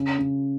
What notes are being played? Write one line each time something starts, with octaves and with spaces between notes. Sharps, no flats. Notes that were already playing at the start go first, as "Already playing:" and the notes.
Already playing: C#3
C#3